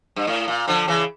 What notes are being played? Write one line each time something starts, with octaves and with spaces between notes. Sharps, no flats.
G2
A2
A#2
D3 F3
C#3 E3